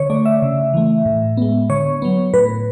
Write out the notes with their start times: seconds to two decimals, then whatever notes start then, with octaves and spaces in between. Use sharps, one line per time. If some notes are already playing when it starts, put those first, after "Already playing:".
Already playing: D3 C#5
0.10 A3 D5
0.25 E5
0.42 C#3
0.73 E3 A3
1.06 A2
1.37 G#3 B3
1.70 D3 C#5
2.02 F#3 B3
2.33 A2 B4